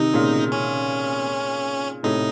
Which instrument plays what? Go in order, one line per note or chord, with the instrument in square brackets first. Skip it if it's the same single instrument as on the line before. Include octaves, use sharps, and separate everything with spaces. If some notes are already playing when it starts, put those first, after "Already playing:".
Already playing: [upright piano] C3 D#3 [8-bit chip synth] D#4
[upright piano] A#2 C#3
[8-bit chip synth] C#4
[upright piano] A2 C3 [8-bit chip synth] D#4